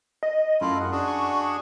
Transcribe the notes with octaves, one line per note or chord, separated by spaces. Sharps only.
D#5
F#2 A3 E4 F4
G#4 F#5
D4 F#4 G#4
C#6